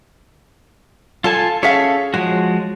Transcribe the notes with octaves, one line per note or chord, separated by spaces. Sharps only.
F4 A4 G#5 A5
C#4 G#4 A4 C#5 E5 F5
F3 G#3 F#4 C#5